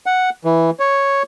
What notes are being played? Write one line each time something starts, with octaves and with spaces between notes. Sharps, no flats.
F#5
E3
C#5